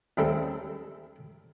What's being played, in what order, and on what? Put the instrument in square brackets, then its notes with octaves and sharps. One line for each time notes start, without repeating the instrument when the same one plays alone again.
[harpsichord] D#2 G3 A3 C4 C#4 A4